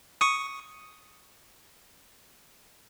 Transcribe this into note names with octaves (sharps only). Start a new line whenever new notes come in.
C#6 D#6